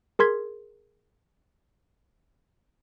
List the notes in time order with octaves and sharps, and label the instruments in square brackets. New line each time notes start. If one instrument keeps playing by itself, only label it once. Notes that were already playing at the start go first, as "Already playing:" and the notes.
[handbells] G#4 A#4 C6 G#6 B6